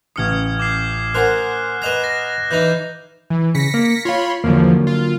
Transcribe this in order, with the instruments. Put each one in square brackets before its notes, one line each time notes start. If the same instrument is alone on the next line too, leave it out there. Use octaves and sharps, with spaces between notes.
[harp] A1 C#7 [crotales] D#6 F6 G#6
[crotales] D6 G6 C7
[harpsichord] A#4 C5 [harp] F#5 G#5 C6 [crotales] F#6
[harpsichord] B4 D#5 A#5 [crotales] F#6 E7
[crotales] A#6
[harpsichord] E3 D#4 [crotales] G6
[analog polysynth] E3
[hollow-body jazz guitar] C#3 [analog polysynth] A#6 B6 C#7
[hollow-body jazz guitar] A#3
[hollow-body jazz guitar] F4 F5 [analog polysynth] C#5 B5 C6
[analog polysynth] E2 F3 [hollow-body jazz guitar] D3 F#3 A#3
[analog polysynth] F4